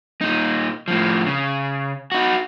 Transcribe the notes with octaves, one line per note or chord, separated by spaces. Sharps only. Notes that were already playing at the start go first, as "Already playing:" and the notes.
A#2 D#4
A2 F3
C#3
D#4 F#4